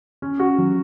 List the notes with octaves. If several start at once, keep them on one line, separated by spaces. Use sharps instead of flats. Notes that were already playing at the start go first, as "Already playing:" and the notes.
C#4
F#4
F#3